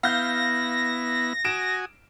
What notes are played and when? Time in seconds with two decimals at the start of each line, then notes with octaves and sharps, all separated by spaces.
0.03 B3 E4 F5 G6 A#6
1.44 F#4 G#5 D#6 D7 E7